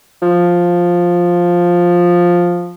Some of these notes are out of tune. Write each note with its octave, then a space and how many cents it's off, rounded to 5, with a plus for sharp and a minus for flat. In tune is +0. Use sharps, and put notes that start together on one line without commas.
F3 +5